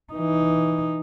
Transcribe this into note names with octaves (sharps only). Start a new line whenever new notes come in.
E3 D#4